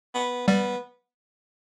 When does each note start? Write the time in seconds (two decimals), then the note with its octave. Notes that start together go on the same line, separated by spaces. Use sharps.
0.15 B3
0.48 G3 B3